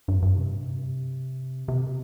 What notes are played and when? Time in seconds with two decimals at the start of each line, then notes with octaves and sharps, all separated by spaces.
0.08 G2
0.22 G2
0.37 C3
1.68 C3